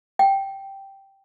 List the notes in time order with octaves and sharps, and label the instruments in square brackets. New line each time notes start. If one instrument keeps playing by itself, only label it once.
[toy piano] G5